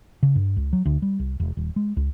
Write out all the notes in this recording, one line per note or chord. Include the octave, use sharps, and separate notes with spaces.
C#3
G2
C#2
F#3
D2
G3
C2
E1
D#1
G#3
C#2